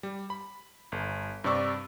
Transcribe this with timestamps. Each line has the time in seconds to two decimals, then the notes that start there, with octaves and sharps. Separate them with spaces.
0.03 G3
0.30 B5
0.92 G1
1.44 G2 C3 G3 D5 C#6 E6